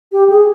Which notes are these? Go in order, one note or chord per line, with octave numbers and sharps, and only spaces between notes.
G4
G#4